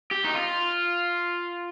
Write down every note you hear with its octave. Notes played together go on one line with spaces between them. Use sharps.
G4
D#4
F4